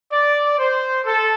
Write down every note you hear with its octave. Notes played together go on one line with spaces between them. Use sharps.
D5
C5
A4